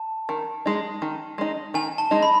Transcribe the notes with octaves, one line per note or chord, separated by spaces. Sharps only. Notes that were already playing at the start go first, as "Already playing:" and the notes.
Already playing: A5
D#3
G#3 D#4
D#3
G#3 D#4
D#3 G#5
A5
G#3 D#4
B5